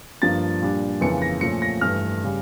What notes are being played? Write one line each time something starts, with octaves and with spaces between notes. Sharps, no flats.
G2 F3 A#3 D4 A6
A#2 G3 D4
F2 C#3 E3 A#3 C#7
A#6
A#2 F3 A3 C#4 C#7
A#6
G2 E3 A3 F6
C#3 G3